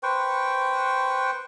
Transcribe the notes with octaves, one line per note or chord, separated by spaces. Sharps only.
B4 C5 G5 C#6